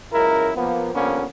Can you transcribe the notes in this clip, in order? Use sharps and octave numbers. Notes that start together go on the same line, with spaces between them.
C#2 F#2 E4 A#4
F3 A#3 B3
D3 F3 G3 A#3 B3 C#4